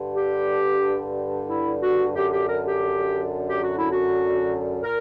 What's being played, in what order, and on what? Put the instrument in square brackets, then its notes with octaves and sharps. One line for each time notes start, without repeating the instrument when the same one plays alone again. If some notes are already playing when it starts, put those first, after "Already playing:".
Already playing: [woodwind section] G2 D3
G4
E4
F#4
F#2 D3 G4
G4
A#4
G4
G4
F#4
E4
F#4
A#2 A#4